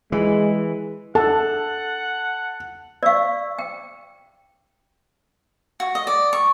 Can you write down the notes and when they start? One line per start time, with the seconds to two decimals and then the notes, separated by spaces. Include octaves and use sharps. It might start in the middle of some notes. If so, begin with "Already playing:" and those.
0.12 E3 G#3
1.15 A4 F#5 A5
3.03 D5 F5 C#6 E6
3.59 G5
5.80 F#4
5.95 D#5
6.07 D5
6.33 C#6